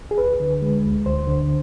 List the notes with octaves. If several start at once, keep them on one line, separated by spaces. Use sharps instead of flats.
G#4
D2 B4
D3
G#3
D2
D2 C5
D3